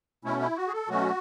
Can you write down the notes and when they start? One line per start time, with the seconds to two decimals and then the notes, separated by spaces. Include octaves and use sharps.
0.25 B2 A3 C#4 E4
0.40 E4
0.56 F#4
0.68 G#4
0.72 A4
0.88 B2 F#3 A3 C#4 F#4